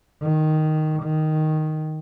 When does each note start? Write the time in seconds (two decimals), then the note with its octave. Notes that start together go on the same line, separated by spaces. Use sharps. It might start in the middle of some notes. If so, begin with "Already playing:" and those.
0.23 D#3
1.04 D#3